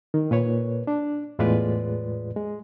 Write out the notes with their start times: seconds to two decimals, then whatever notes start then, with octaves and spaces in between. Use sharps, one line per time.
0.14 D#3
0.31 A#2 B4 C#5
0.87 D4
1.39 E2 A2 G#3 F4 B4 D5
2.36 G#3